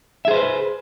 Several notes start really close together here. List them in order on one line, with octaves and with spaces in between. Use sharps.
E5 G#4 C5 B4